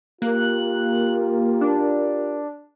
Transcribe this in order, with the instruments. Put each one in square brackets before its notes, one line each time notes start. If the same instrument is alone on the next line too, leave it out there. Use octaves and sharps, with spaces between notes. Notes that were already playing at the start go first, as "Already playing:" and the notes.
[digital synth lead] A#3 [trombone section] F4 G4 A#4 [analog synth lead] F#6
[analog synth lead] D4